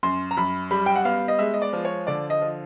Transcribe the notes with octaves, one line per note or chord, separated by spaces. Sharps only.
F#2 C6
A#5
F#2 B5
G3 B5
G5
F#5
B3 F5
D#5
G#3 E5
D#5
D5
F3
C#5
D3 D5
D#5
F3